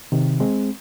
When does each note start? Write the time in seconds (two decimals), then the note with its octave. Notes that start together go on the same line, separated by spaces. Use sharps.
0.12 C3 D#3
0.40 G#3 C4